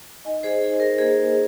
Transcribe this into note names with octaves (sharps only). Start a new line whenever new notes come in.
D#4 D#5 G#5
G#4 C5
D#4 G#4
C5
A#4
A#3 G#4 C5